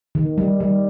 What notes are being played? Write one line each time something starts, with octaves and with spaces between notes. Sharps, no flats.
D#3
G3
G3